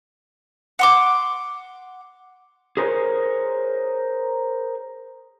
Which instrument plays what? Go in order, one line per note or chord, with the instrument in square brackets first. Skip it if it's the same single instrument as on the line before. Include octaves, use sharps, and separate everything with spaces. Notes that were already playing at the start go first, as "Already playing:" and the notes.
[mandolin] F#5 C6 D6
[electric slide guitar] G#4 A#4 C5 C#5